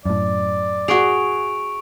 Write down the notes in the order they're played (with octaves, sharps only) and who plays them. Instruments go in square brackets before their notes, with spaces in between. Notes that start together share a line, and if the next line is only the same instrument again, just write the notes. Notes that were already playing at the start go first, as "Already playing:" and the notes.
[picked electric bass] F#2 A2 [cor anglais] D5
[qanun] F#4 G#4 [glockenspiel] C#6 D7 F7